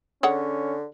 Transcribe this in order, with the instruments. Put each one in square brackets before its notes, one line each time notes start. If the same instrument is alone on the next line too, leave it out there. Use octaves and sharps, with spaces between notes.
[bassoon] D3 [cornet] C#4 [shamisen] G#4 C#5 F#5